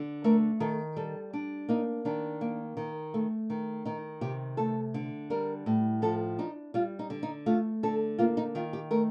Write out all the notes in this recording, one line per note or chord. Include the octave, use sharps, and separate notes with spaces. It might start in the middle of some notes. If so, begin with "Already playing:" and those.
Already playing: D3
A3 A#4
D#3 A4
G3 A4
D4
A#3 D#4
D#3 D4
A#3
D#3
A3
D#3
D#3 D#4
C3 G4
A3 A4
D3
G3 A#4
A2
F3 A4
D4 D#4
G3 F4
D#4
D3
D#4
A3 F4
D3 A4
A#3 F4
D#4
D#3 F4
G4
A3 A#4